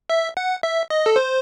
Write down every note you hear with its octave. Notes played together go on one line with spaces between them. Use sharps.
E5
F#5
E5
D#5
A4
C5